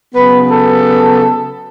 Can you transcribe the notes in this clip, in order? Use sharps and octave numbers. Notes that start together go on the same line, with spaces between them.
C#3 F#3 B3 B4
A4